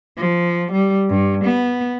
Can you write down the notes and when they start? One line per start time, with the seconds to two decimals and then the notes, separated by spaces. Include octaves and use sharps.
0.17 F3
0.72 G3
1.09 G2
1.44 B3